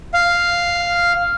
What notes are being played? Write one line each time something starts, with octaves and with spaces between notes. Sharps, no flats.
F5